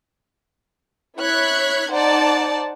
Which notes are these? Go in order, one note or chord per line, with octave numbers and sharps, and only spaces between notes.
E4 C#5 F#6 G#6 B6
D#4 C5 D5 F#5 A5